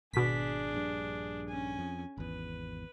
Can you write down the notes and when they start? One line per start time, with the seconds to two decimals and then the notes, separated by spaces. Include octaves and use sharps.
0.13 G#1 B2 D4 G#4 B6
0.73 A#1 G2
1.48 C#4 G#5
1.79 F2
2.18 G#1 E2 B4